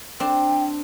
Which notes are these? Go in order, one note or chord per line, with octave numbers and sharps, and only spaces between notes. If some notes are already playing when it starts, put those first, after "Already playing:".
C4 D4 G5